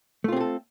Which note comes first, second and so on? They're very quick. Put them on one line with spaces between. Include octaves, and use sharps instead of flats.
A3 F4 C4 G#4 A4